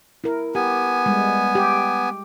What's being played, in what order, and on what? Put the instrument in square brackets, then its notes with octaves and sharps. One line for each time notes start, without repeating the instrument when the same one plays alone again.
[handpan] E4 A#4
[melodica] B3 G#5 [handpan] G4
[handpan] G3 G#3
G4